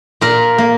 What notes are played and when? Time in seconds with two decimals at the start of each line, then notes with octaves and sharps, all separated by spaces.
0.21 A#2 A#4
0.58 A#3